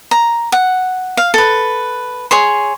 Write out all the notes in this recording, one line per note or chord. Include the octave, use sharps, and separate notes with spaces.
A#5
F#5
F5
A4 B4
G#4 C#5 C6